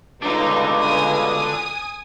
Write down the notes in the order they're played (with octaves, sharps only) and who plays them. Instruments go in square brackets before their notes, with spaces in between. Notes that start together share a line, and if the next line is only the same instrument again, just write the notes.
[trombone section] C#2 G2 B2 [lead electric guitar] D3 D4 [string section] D#4
[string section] G#5 D#6